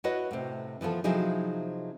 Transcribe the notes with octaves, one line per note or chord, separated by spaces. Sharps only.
E4 F#4 B4 C#5 D#5 F#5
A2 C3
E3 F3 B3 F4 A4
C3 F3 F#3 D#4 E4 G#4